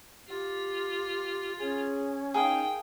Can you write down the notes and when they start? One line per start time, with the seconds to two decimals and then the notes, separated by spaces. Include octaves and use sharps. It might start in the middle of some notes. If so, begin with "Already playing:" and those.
0.28 F4 G4
1.59 C#4 G#4
2.34 D#4 G#4 A#4 F5 G5